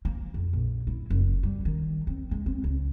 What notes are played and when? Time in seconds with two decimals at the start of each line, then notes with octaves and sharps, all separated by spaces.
0.05 A#3
0.34 F2
0.53 A#1
0.87 E4
1.10 F#1
1.43 G3
1.65 D#3
2.07 C4
2.31 G#3
2.46 C4
2.64 C#2